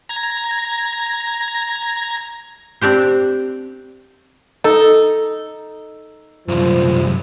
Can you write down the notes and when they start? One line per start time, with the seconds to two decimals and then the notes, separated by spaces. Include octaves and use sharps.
0.09 A#5 G#6 A#6
2.81 C4 D4 G4 C5
4.64 D#4 A4
6.48 C2 F#2 F3